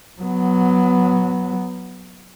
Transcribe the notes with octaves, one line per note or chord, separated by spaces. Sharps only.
F#3 B3